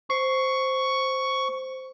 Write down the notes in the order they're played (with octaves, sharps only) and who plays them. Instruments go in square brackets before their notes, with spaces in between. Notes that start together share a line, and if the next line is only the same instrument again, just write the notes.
[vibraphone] C5 [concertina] C#6